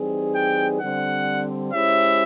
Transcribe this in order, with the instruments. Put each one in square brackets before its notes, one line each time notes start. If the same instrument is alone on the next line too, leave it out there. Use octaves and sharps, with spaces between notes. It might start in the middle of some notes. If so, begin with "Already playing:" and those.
Already playing: [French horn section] E3 G3 C4 D#4 G#4
[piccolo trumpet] G5
[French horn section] D3 G3 C4 [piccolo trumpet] F#5
[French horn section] G#3 C#4 E4 G4 C5 [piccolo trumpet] E5